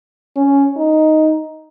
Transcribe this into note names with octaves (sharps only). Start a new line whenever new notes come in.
C#4
D#4